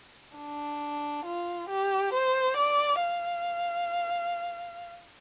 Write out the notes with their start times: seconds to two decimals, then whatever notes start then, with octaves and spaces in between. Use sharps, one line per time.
0.37 D4
1.26 F4
1.69 G4
2.13 C5
2.57 D5
3.01 F5